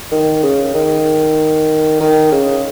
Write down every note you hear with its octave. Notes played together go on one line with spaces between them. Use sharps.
D#3
C#3
D#3
D#3
C#3